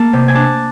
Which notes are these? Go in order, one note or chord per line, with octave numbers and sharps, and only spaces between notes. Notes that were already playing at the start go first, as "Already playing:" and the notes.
Already playing: A#3 A5
C3
G#5
D4 A5